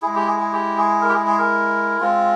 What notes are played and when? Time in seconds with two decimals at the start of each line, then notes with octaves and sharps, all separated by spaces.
0.02 G#3 E4 G#4
0.15 G4
0.27 G#4
0.40 G#4
0.53 G4
0.77 G#4
1.01 A#4
1.09 G4
1.14 G#4
1.26 G#4
1.38 A#4
2.00 G#3 C4 F4